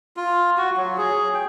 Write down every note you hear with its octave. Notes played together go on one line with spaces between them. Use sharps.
F4
F#4
F#3
G#4
G5